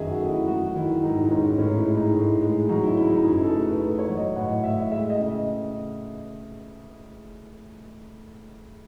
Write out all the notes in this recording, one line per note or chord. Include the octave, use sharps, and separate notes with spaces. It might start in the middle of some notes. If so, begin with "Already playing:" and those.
Already playing: F#2 D#3 F#3 G#4 D#5 E5
F#4
A3
E4
F#3 F#4
D#3 E4
G#2 D#4
D#4
G#2 C#4
A2 C#4
E4
G#3
D#4
A2
G#3
F#3 D#4
E4
C#3 E4
D#4
F#2 G#4
A4
A3
B4
A3
C#5
F#3
D#5
A2 F#5
A2 E5
G#3 E5
D#5
C#3